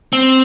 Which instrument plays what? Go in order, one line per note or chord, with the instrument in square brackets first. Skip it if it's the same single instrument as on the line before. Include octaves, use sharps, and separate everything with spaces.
[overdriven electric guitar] C4